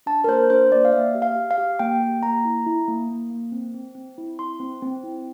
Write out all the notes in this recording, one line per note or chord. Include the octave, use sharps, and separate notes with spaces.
D4 A5
A#4
A#3 C5
D4 C5
A#3 D5
F5
A#3 E5
G4
F5
G4
F5
G4
A#3 G5
G4
A#3 A#5
E4
E4
A#3
A#3
A#3
C4
C4
C4
E4
E4 C6
C4
C4
E4